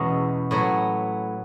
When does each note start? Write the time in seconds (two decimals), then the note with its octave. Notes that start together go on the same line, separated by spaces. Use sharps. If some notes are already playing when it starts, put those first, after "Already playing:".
Already playing: E2 B2 G#3 C#4
0.51 A2 F#3 B3